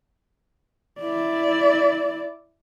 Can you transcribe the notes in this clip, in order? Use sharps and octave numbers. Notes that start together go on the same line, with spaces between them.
E4 D5